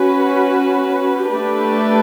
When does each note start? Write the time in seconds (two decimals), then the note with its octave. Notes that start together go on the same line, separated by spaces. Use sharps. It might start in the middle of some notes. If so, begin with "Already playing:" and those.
Already playing: C#4 F#4 B4
1.30 A3 D4 G4 B4 D5